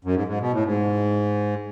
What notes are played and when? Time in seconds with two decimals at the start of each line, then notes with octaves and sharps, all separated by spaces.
0.05 F#2
0.15 G#2
0.28 G#2
0.41 B2
0.53 A2
0.65 G#2